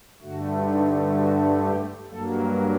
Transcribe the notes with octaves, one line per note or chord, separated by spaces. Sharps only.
G2 D3 A3 F#4
D#4
F#4
G4
G2 F#3 A#3 A4